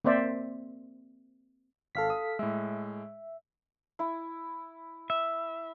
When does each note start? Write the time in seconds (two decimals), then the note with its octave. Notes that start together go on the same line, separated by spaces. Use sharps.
0.04 A#3 C4 C5 D5 E5
1.95 G#1 A4 F5 B6
2.10 D#6
2.39 A2 G#3 E5
3.99 E4
5.10 E5